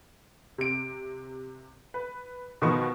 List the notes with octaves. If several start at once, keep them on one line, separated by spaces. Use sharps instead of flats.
C3 D7
B4
B2 D#3 F3 B3 C#6